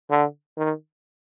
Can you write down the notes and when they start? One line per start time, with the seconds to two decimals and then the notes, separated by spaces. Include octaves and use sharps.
0.11 D3
0.57 D#3